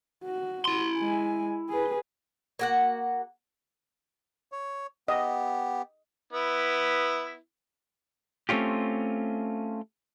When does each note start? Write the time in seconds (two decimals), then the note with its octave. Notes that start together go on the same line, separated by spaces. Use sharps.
0.24 F#4
0.65 E4 C6
0.98 G#3 G#5
1.69 G#4 B4
2.59 A#3 F#4 F#5
4.52 C#5
5.08 B3 G4 D#5
6.33 B3 E4
8.49 A3 C4 C#4 F4 G4